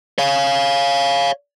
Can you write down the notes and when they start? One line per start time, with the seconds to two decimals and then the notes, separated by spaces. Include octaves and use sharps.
0.18 C#5 F5